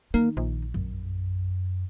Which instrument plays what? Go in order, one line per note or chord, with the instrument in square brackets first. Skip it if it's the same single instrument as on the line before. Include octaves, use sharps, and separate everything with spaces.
[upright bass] D#3 D#4 [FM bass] A#3
[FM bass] A#1
[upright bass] F#2